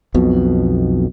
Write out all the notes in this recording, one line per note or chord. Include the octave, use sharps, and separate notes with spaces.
B1 F2 B2